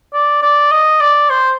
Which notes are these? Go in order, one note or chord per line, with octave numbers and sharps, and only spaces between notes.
D5
D5
D#5
D5
C5